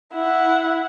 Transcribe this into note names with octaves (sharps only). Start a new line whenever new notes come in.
E4 F#5